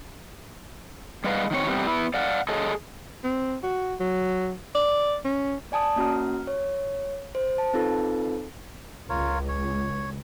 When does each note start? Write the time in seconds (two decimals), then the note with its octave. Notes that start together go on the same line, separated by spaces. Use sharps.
1.24 G3 G#3 B3 B4 D#5 F5
1.51 D#3 F#3 C4 C#5
1.67 C3 E3 G3 B3 C4
1.87 B3 E4
2.14 D5 F5 F#5
2.49 G#4 A4 C#5 D#5
3.24 C4
3.63 F#4
4.00 F#3
4.75 D5
5.25 C#4
5.72 D5 G#5 A5 D#6
5.96 A#3 C#4 F#4 A#5 F6
6.47 C#5
7.35 C5
7.58 A5
7.74 C4 D#4 F4 A4 B4
9.09 C#2 F4 A#4 C#5
9.49 C#5